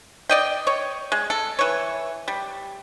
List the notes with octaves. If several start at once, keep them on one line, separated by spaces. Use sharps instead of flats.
D5 D#5 G5
C#5
G#3
A4
E3 C#5
G3